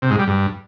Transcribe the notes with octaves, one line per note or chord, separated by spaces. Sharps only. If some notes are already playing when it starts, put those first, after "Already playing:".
C3
G#2
G3
G2